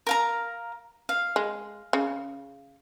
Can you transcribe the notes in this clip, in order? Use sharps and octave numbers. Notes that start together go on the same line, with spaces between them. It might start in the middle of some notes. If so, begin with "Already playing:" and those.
A#4 F5 A#5
F5
G#3
C#3